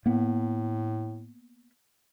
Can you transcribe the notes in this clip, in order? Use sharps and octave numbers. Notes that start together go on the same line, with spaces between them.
A2 A#3 B3